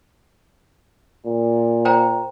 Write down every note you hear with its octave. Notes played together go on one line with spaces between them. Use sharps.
A#2
C5 G5 A#5